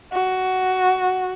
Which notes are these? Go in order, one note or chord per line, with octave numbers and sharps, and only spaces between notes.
F#4